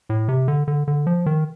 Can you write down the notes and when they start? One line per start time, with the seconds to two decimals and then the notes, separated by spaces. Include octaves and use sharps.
0.09 A2
0.28 C3
0.48 D3
0.68 D3
0.87 D3
1.07 F3
1.26 D#3